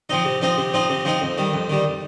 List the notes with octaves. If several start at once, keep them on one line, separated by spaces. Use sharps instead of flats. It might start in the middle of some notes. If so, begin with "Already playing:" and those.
F3 C4 D#4
C3
F3 C4 D#4
C3
F3 C4 D#4
C3
F3 C4 D#4
F2
D#3 G3
F2
D#3 G3